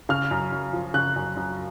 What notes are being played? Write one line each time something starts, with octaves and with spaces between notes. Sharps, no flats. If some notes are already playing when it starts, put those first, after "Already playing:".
C#3 F6
F#2
F#2
F3
C#3 F#6
F#2
F#2